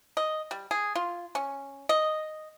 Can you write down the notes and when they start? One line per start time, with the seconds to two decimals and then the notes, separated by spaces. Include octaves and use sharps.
0.17 D#5
0.51 G3
0.71 G#4
0.96 F4
1.35 C#4
1.89 D#5